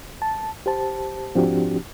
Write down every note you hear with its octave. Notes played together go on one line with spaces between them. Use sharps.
A5
G4 C5 A5
G#2 F3 C4 D4 F#4 G4